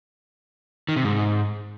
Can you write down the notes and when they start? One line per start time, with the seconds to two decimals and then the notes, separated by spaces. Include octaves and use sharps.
0.89 D#3
0.96 C3
1.04 G#2